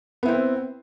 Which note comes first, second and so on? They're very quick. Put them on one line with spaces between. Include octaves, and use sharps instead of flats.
B3 E4 C4